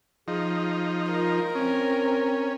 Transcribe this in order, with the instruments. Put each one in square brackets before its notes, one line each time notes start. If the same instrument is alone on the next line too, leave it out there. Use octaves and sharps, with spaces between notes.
[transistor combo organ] F3 D#4 [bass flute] G#4
[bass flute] F4 [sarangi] A#4
[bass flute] C4 [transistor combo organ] C#4